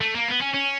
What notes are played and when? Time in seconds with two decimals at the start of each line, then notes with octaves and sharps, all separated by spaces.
0.01 A3
0.15 A#3
0.28 B3
0.41 C#4
0.54 C#4